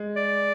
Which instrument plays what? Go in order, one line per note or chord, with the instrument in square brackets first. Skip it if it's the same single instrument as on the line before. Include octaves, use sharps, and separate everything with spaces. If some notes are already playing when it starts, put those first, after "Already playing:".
Already playing: [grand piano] G#3
[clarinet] D5